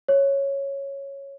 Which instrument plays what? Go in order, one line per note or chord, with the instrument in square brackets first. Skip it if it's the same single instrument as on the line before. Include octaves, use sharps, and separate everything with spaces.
[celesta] C#5